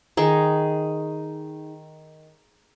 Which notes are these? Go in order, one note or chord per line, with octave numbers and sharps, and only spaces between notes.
D#3 D#4 G#4